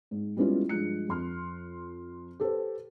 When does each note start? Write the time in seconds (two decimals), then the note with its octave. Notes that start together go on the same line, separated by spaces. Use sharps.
0.11 G#2
0.37 G3 G#3 B3 C#4 E4 F4
0.69 G2 F3 G#3 F#6 C#7
1.09 F2 C6 F6
2.40 G4 A4 B4 C5